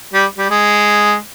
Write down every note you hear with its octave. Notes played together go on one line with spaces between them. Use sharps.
G3
G3
G#3